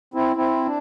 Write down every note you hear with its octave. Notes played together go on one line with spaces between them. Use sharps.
C4 E4
C4 E4
D4